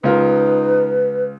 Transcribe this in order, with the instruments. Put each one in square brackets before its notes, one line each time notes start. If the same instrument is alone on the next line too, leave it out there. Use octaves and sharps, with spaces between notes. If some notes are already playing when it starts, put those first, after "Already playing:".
[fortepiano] C#2 F4 A#4 [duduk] D#4 [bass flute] B4